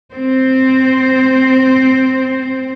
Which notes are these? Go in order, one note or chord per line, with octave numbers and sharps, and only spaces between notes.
C4 C5